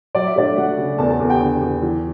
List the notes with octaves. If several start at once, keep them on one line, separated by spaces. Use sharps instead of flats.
F#3 D5
E5
A3 D4 D5
D2 F#4 F#5
C#3
E2 A4 A5
A4 A5
E2
G4 G5
D3
E2
E3